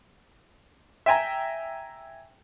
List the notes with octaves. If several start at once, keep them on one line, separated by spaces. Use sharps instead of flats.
E5 G5 G#5 A#5